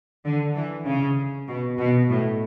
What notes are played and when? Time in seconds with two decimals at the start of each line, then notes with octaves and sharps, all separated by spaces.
0.25 D3
0.55 E3
0.85 C#3
1.47 B2
1.78 B2
2.09 A2